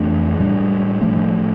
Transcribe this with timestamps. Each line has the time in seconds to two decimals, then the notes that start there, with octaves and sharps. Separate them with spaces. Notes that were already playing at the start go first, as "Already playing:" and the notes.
Already playing: F2 E3 A3 D4
0.40 A2 G3 D4
1.01 A2 F3 A3